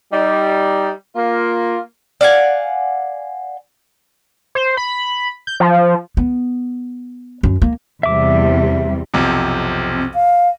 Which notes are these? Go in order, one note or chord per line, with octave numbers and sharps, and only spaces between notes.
G3 D#4
A#3 F4
D5 F5 F#5 G#5
C5
B5
G6
F3
B3
F#2
A#3
E2 C3 G3 E5 D6
B1 F2 C3
C4
F5